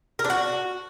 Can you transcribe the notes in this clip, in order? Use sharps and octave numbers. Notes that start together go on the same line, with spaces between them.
A#4
D4
F#4